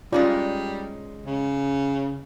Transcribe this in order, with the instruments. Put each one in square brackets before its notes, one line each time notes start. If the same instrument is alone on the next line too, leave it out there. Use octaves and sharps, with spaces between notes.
[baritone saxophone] G3 [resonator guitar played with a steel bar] G#3 C#4 D#4 [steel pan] F4 D5
[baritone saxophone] C#3